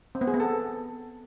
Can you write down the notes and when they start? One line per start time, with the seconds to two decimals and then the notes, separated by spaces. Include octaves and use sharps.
0.15 C4
0.21 B3
0.27 G#4
0.34 B3
0.40 A4